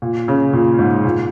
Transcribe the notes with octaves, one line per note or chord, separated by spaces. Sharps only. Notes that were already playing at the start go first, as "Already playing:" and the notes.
A#2
C#3
A#2
G#2
A#2